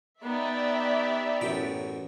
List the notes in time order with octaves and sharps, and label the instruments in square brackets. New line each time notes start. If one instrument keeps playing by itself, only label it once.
[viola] B3 D#4 [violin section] G4 D5 E5
[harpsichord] A1 F#2 G5